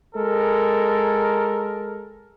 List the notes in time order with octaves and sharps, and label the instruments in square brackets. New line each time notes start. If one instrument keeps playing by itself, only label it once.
[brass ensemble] G#3 A4 A#4